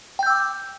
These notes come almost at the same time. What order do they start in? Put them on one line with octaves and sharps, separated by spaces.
G5 G6 E6 D6